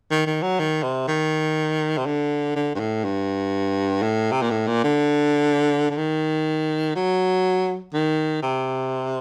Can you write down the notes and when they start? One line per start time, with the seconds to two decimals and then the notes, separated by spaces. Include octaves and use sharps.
0.11 D#3
0.27 D#3
0.43 F#3
0.60 D#3
0.84 C3
1.08 D#3
1.98 C3
2.06 D3
2.56 D3
2.75 G2
2.80 A2
3.04 G2
4.02 A2
4.32 C3
4.42 A#2
4.51 A2
4.68 A#2
4.84 D3
5.90 D3
5.98 D#3
6.96 F#3
7.94 D#3
8.43 C3